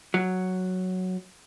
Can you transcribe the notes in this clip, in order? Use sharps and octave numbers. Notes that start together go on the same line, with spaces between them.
F#3